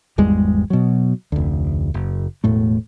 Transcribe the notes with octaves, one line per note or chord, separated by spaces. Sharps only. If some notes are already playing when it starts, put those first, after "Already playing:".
G#1 E2 G3 G#3
B2 F#3
F1 D2
F#1
E1 A2 A3